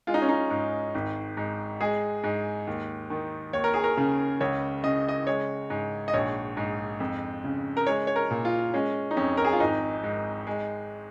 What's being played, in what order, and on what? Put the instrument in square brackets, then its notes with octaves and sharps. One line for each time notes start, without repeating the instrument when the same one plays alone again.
[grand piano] G#3 F4
D#4
C#4
D#4
G#2
G#1
G#2
G#3 G#4
G#2
D#2
D#3
D#2 C#5
A#4
G#4
A#4
C#3
C#2 C#5
C#3 D#5
D#5
G#3 C#5
G#2
D#5
A#1 C#5
G#2
F2
C#3
A#4
G#3 C#5
C#5
A#4
A#2
F4
G#3 C#4
D#4
F2 C#4
A#4
G#4
F4
G#1 D#4
G#2
G#3